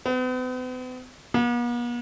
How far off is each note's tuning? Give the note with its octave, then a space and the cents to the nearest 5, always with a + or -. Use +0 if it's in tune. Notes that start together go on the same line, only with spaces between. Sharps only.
B3 +45
B3 -45